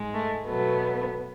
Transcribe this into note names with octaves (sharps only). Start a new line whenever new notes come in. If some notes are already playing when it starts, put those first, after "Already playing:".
Already playing: G#2 G#3
A3
B2 F#3 A3 B3